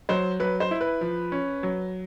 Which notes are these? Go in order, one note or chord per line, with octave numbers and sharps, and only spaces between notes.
F#3 C5
F#3 B4
C5
E4
B4
F3
C#4
F#3